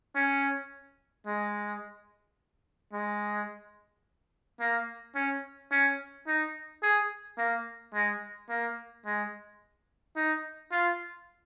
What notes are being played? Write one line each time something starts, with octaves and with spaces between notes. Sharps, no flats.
C#4
G#3
G#3
A#3
C#4
C#4
D#4
G#4
A#3
G#3
A#3
G#3
D#4
F4